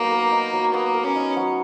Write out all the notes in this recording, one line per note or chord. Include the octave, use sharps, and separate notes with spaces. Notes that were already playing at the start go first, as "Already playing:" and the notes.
Already playing: F#3 A#3 B3 D#4
A#4
D#4
F#3
A#3 B3
A#4
C#4
D#4
F#3